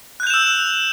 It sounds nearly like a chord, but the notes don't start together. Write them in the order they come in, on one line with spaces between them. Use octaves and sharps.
F#6 G6 F7 E7 E6